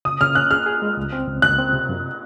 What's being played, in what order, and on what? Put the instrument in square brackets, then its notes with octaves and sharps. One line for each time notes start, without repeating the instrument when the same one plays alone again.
[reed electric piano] C#3 [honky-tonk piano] D#6
[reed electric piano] C#3 [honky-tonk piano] F6
[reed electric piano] C#4 [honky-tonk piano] F#6
[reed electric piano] G#4 [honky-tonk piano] F6
[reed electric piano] G#4
G#3
C#2
C4
C#2
[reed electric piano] C#2 [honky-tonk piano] F#6
[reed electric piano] C4
C3
F#2